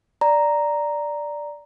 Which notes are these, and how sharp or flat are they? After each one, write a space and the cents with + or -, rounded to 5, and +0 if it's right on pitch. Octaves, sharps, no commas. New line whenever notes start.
D5 +0 A#5 +0